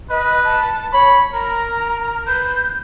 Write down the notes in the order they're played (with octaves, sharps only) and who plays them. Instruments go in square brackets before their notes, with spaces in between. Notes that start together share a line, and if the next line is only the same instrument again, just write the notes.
[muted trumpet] B4 [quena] D#5
[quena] A5
[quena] C#5 [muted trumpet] B5
[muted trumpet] A#4 [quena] A#5
[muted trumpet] B4 [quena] G6